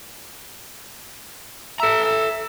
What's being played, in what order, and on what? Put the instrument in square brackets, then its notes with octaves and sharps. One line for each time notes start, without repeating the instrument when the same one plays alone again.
[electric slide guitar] A4 A#5 [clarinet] E5
[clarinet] E5